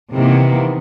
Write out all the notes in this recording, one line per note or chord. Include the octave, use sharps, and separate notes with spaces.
C3 D#3 E3 A#3 B3